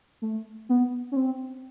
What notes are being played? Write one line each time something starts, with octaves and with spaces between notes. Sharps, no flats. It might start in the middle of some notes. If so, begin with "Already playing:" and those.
A3
B3
C#4
C4